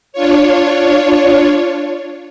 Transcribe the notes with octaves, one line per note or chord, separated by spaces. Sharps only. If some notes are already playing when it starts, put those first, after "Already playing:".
D4 F4 C#5